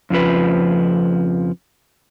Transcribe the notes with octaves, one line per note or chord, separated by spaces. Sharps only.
F2 C#3 F3 B4